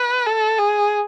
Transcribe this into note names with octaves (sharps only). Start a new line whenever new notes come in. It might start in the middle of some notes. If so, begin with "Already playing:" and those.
Already playing: B4
A4
G#4